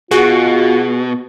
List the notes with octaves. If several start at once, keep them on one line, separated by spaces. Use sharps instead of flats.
B2 F4 F#4 G#4